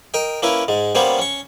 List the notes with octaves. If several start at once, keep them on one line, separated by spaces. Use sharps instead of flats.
A#4 D#5 G5
A#3 C#4 E4 A#4 B4
G#2 G#3
G3 A#3 B3 C#4 C5 C#5
C#4 C#6